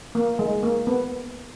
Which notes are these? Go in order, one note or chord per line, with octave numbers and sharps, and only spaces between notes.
A#3
G#3
A#3
B3